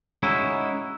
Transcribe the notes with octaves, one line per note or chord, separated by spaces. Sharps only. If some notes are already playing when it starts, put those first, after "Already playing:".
G#3 C#4 D#4 E4 F#4